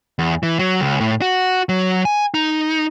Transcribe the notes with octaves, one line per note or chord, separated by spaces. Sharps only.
E2
E3
F#3
C#2
A2
F#4
F#3
G#5
D#4